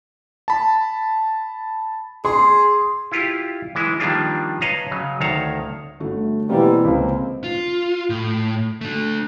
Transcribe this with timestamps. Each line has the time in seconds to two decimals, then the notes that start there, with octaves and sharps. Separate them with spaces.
0.48 A5 B5
2.25 G#4 C6
3.12 E4 F4 G4
3.75 E3 G#3 E4
4.00 D#3 F3 G3 A#3 D4 F4
4.61 B4 C#5 D#5 F5 A5 A#5
4.91 C#3 F#3
5.21 D2 D#3 C#5 F5 A5 A#5
6.00 G1 A3 F#4
6.49 B2 E3 G3 A#3 C4
6.85 C#2 A#3 C4
7.44 F4
8.10 A2
8.81 A3 D4